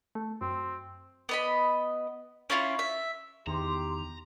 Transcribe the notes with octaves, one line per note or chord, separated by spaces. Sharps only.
A3
F#2 C4
B3 D#5 B5
C#4 E4 F4 C#5
E5
E2 D#3 G4 A#5 C6